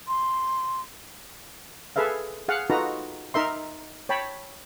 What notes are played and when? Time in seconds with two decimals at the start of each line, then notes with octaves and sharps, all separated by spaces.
0.08 C6
1.96 G#4 A4 B4 E5 F5
2.48 G#4 F5 F#5
2.70 D#4 F4 F#4 A4 B4 A#5
3.34 D#4 A#4 E5 C6
4.09 C#5 G5 A5 B5